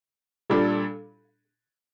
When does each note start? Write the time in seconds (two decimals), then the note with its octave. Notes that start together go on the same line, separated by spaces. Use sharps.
0.50 A#2 G3 D4 A4